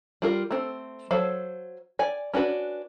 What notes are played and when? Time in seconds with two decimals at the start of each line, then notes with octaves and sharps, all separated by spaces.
0.22 G3 F4 A#4
0.51 A3 C4
1.11 F#3 A4 C5 F5
1.99 D5 G#5
2.34 C#4 D4 F#4 B4